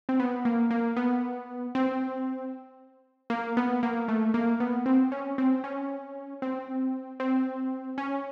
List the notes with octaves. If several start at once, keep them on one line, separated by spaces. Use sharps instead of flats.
C4
B3
A#3
A#3
B3
C4
A#3
B3
A#3
A3
A#3
B3
C4
C#4
C4
C#4
C4
C4
C#4